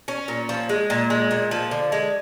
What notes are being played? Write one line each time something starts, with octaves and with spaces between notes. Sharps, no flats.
C#4
A#2
F3
G#3
A#2
G#3
A#2
F3
D3
G#3